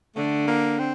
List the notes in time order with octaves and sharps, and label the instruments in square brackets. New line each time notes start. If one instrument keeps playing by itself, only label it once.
[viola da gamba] D3 [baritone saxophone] A3
[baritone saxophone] A#3
C4